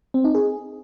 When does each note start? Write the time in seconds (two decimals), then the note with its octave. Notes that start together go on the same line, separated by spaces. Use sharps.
0.14 C4
0.24 D#4
0.35 G#4